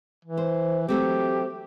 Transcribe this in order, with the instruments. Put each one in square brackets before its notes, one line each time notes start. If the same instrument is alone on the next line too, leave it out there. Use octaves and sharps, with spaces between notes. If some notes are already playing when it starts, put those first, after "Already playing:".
[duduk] E3
[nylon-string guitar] C5
[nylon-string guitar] F#3 A3 C4 [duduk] G4